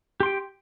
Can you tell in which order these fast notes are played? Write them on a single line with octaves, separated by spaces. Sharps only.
G4 C6 G5